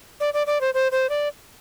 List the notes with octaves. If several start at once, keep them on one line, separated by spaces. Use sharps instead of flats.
D5
D5
D5
C5
C5
C5
D5